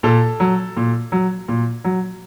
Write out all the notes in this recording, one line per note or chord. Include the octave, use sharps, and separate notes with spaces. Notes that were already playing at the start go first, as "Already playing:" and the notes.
A#2 A4
F#3
A#2
F#3
A#2
F#3